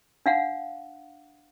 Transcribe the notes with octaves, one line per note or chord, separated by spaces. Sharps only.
D4 F5 F#5